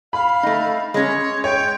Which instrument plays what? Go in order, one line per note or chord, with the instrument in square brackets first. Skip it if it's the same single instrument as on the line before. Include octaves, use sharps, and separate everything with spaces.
[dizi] F5 [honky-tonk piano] B5
[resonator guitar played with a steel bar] A3 D#4
[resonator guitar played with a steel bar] G#3 C#4 [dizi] C#5
[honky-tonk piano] C#5 [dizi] G5